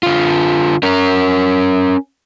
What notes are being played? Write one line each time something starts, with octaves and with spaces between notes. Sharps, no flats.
D3 F4
C#4 A#4